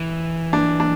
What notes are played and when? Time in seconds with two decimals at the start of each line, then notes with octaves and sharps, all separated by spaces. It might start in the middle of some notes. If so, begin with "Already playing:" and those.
Already playing: E3
0.53 D4
0.80 D4